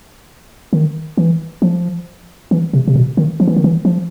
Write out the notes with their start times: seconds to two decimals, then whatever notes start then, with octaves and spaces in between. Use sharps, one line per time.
0.73 D#3
1.17 E3
1.62 F3
2.51 E3
2.73 C3
2.88 C3
2.95 B2
3.17 D#3
3.40 F3
3.48 E3
3.56 D#3
3.64 E3
3.85 F3